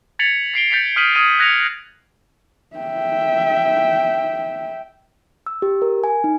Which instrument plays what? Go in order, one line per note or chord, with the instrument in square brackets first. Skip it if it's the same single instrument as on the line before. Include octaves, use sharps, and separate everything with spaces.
[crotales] G#6 A6 B6 C#7 F7 F#7
B6 C7 D7 G7
G6 A6 B6 C#7 F7
D#6 F6 B6 D#7 F#7
D#6 F6 G#6 D#7
F#6 G#6 A#6 C#7 D#7 F7
[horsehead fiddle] E5 G5
[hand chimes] E6
G4
A#4
G#5
D#4